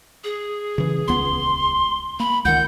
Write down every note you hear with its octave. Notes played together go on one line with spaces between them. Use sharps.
G#4
C#3 E3
D#1 C#2 B3 C6
A#3 B5
C#2 D#3 F#5 G6